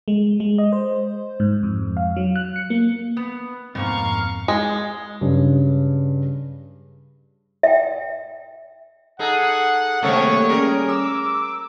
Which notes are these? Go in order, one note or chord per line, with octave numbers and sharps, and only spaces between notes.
G#3
G#3
D#5
C5
G#2
F2
F5
F#3
F#6
C#7
A#3
B3
F2 G#2 B2 A#3 C4 F5 A#5 C#6
G#3
G2 C#3
E5 G5
D#4 G#4 A4 F#5
C3 D#3 G3 A3 A#3 A4 C#5
G3 C#4 G#4 A#4
D6 E6